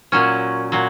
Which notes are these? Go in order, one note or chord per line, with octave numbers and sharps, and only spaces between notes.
A#2 F#3 C#4
A#2 F#3